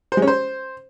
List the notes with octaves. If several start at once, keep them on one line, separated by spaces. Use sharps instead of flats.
C5
G#3
C#4
C5